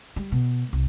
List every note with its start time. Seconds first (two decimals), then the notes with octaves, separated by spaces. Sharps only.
0.16 G3
0.32 B2
0.73 C2